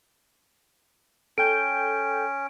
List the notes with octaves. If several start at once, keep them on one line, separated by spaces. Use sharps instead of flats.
C#4 A4 G5 G6 D7